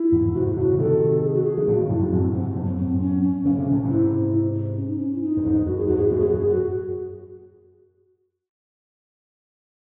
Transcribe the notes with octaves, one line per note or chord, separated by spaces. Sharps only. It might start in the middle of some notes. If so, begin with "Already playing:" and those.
Already playing: E4
E2 G#2
G#2 C3 F#4
E4
A2 C#3 F#4
C#3
C3 D#3 A4
G#4
F#4
G#4
D#3
A2 C#3 F#4
F#2 A2 E4
G#2
C#4
F#2 A2 C4
G#2 C3 C4
F#2 A2
C4
C#4
C#4
C#3 C#4
C3
A2
G#2 C3
E4
C#4
D#4
C#4
E4
D#4
F#2
E2 G#2
F#2 F#4
G#4
E2 G#2 F#4
G#4
F#2 A2 F#4
G#4
F#4
F#2 G#4
F#4